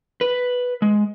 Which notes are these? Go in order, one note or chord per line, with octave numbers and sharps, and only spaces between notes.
B4
G#3